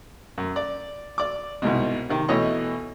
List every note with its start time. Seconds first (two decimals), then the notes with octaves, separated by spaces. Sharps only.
0.38 F#2
0.56 D5
1.18 D5 D6
1.62 C2 G#2 B2
2.09 C3 D#3
2.28 B2 E3 A3 C#5 D#5 C#6